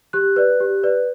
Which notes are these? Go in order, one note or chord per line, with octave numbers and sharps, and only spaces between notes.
G4 F#6
B4 D5
G4
B4 D5